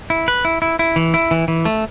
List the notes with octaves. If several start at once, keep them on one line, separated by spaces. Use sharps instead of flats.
E4
B4
E4
E4
E4
E3
E4
E3
E3
A3